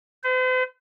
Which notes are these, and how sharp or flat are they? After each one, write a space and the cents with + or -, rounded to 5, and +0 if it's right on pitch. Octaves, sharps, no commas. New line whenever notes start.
C5 -45